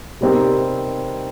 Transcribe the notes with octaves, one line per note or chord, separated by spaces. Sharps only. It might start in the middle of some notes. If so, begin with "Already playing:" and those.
C3 G3 C4 D#4 A#4